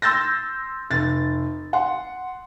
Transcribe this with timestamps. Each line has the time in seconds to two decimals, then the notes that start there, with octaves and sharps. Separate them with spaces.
0.02 C6 E6 G6 A6 A#6
0.90 F1 A6
1.73 F#5 C6